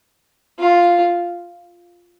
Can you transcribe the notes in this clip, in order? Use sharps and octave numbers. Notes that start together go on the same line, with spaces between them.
F4